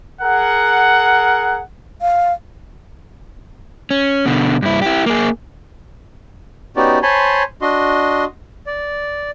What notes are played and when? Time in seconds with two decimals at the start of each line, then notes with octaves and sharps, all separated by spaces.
0.21 G#4 A#4 F#5
2.02 F5
3.91 C#4
4.26 B2 D3
4.62 G2 E4
4.82 E4 G4
5.06 A#3 G#4
6.76 B3 C#4 D#4 F#4 G4 D5
7.03 C5 C#5 G#5 A5 B5 C6
7.62 D4 F#4 D#5 C6
8.66 D5